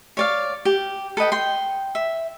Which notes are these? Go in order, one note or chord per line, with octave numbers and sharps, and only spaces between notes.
C#5 D5 F5
G4
A4 B4 D#5 G5
G5 C6
E5